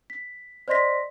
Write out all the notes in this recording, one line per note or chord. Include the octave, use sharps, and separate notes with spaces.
B6
C5 D5 D#5 C6 A#6 B6